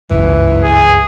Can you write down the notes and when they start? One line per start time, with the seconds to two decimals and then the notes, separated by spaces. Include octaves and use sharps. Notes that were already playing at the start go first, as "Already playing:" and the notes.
0.11 G1 C#2 F#2 E3
0.64 G#4